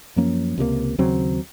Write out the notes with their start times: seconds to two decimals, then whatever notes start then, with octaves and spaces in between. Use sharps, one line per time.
0.16 F#2 F3 A#3 C#4
0.58 C#2 C3 F#3 A#3
0.98 D#2 C#3 F#3 C4